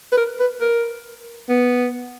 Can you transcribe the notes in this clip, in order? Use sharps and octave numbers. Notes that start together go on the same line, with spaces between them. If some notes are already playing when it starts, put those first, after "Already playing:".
B4
A#4
B4
A#4
B3